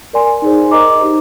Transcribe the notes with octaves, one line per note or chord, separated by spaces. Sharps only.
A#4 D5 G#5 C6
D#4 G#4 C5
A#4 D#5 A#5 D6
D#4 G4 C5